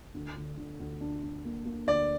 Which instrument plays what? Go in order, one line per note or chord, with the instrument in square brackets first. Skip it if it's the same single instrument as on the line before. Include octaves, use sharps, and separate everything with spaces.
[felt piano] D2
D3
D3
D2
D4
D4
A#3
A#3
[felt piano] D2 [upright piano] D5